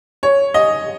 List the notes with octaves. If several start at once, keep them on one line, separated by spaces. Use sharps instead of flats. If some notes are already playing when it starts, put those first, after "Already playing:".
C#5
D#5